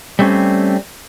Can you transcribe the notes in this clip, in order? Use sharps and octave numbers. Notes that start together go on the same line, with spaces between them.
G3 A3 C4 C#4